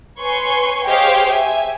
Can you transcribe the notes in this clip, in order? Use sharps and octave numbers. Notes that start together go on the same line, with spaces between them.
B4 C#5 G#5 C6 C#6
G4 G#4 C5 C#5 D#5 F5
E5 G#5